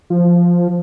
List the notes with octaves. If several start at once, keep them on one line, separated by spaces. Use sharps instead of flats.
F3